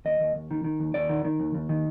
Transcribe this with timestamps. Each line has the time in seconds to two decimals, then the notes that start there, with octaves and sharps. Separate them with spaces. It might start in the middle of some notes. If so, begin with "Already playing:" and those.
0.05 D#2 D#5
0.20 D#2
0.35 D#2
0.51 D#3
0.64 D#3
0.80 D#2
0.94 D#2 D5
1.09 D#3
1.25 D#3
1.40 D#2
1.54 D#2
1.69 D#3